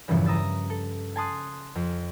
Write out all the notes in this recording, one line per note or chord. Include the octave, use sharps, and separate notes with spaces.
E2 G2 A#2 C#3 E3 F3
A#5 D#6 E6 A6
A4
G#5 A5 C6 D#6 F#6
F2